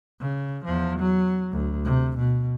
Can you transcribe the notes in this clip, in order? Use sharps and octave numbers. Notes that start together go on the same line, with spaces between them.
C#3
E2 F3
F#3
D2
C3
B2